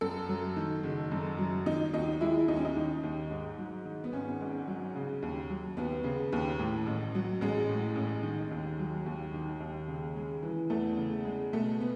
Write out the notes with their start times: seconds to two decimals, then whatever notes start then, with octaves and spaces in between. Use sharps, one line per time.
0.01 F#2 A4
0.29 F#3
0.57 D#3
0.83 F#1
1.11 F#2
1.38 F#3
1.66 D#3 D#4
1.93 D#2 D#4
2.21 G#3 E4
2.48 D#2 D#4
2.56 C#4
2.65 D#4
2.76 D#3
3.03 D#2
3.31 G#2
3.58 F#3
3.85 D#3
4.04 B3
4.13 G#1 C#4
4.41 G#2
4.68 F#3
4.96 C#3
5.22 D#2
5.50 F#3
5.77 D#2 B3
6.04 C#3
6.32 D#2
6.59 A2
6.86 A1
7.15 F#3
7.41 A1 G#3
7.69 A2
7.96 A1
8.23 D#3
8.51 D#2
8.79 F#3
9.06 D#2
9.34 D#3
9.60 D#2
9.88 C#3
10.16 G#3
10.43 E3
10.70 E2 A3
10.97 C#3
11.25 G#3
11.53 B2 A3
11.81 B3